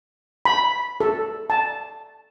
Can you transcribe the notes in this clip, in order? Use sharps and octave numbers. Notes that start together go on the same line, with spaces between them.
B5
A4
A5